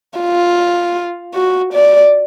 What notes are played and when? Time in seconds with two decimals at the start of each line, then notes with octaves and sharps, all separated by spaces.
0.19 F4
1.35 F#4
1.73 D5